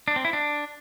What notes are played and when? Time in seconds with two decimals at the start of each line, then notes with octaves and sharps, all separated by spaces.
0.08 D4
0.16 C4
0.25 E4
0.33 D4